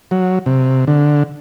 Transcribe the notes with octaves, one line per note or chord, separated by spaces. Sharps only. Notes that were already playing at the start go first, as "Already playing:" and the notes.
F#3
C3
D3